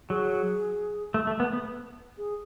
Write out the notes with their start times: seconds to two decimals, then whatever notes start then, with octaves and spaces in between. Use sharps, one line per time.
0.10 F#3 G#4
1.14 A3
1.27 A3
1.40 B3
1.53 B3
2.18 G#4